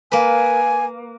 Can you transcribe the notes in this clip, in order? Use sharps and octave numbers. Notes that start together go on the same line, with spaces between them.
A#3 B4 G#5